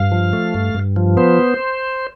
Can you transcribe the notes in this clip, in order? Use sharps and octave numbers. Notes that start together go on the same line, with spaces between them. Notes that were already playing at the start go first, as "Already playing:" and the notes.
Already playing: G2 F5
F3
A3
G2
G2
F3
B3 C5